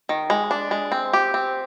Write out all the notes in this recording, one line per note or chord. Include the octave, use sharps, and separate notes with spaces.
D#3
G#3
D4
G#3
C4
G4
C4